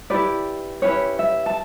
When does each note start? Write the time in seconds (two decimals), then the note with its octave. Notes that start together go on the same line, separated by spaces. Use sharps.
0.10 E4 G4 B4 D5
0.82 C#4 E4 G4 B4 C#5
1.19 E5
1.46 A5